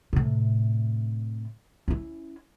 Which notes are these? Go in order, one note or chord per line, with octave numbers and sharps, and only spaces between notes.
A2 C3
C#4 E4